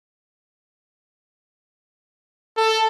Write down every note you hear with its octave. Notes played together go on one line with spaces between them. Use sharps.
A4